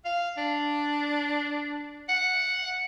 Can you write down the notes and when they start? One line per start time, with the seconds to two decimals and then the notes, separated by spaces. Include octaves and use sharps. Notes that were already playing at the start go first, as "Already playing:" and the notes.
0.05 F5
0.37 D4
2.09 F#5